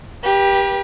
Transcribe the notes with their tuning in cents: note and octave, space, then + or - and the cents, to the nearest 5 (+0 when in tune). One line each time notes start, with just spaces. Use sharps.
G4 +10 B4 -40